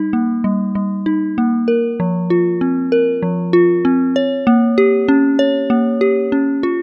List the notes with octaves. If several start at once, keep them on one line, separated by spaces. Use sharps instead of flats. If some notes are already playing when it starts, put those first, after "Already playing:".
Already playing: G3 D#4
A#3
G3
G3
D#4
A#3
A#4
F3
F4
C4
A#4
F3
F4
C4
C#5
A#3
G4
C#4
C#5
A#3
G4
C#4
F4